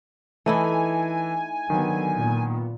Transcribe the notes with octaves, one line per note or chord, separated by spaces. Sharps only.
E3 A3 D#4 E4 G#5
D3 D#3 F#3 B3
A#2 B3